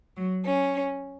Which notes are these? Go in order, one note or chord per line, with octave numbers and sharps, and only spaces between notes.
F#3
C#4